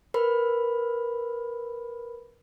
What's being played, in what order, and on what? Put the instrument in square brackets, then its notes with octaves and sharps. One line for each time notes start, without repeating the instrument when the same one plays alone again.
[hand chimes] A#4 B4 B5